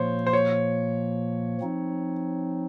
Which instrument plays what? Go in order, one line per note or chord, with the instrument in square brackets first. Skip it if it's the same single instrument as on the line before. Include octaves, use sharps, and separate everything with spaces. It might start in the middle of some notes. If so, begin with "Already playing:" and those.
Already playing: [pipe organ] A#2 F3 A#3 [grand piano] C5 C#5
[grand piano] C5
C#5
[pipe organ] F3 C4 D#4